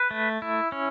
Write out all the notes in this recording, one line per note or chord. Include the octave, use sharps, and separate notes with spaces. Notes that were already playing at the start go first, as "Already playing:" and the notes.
Already playing: B4
A3
E4
C#4